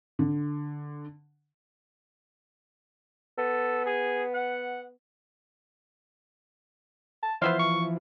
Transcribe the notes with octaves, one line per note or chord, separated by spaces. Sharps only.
D3
B3 A4
G#4
F#5
A5
E3 F3 B3 C5 E5 F5
C#6